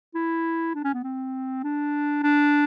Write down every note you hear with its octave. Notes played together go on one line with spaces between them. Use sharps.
E4
D4
C#4
B3
C4
D4
D4